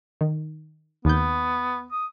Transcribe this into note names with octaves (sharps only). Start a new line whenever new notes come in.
D#3
D#2 B3 G6
D#6